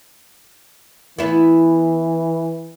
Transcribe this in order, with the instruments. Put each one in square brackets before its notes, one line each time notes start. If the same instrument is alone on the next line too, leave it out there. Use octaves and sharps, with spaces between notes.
[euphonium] E3 [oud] B3 E4